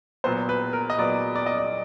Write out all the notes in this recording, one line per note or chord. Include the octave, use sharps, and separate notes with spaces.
A#2 F#3 B3 C5
B4
A#4
D#5
A#2 F#3 B3 D5
D5
D#5
D5